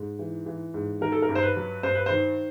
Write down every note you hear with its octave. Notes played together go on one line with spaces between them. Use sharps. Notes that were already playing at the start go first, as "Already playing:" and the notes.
Already playing: G#2
E3
E3
G#2
D#3 A#4
A4
A#4
G2
C5
B4
F#3
G2 C5
B4
D#3 C5